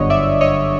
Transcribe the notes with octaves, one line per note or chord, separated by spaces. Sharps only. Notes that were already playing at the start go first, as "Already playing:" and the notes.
Already playing: G1 F#2 D3 C#5 D#5
D5 E5
C#5 D#5